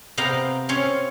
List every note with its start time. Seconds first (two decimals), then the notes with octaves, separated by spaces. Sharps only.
0.17 C3 B3 F5 G5 A#5
0.69 C4 C#4 C#5 F5